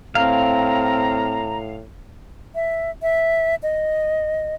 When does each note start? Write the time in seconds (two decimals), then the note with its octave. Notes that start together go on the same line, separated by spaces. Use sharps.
0.15 A2 C4 F5 A#5
2.55 E5
3.02 E5
3.63 D#5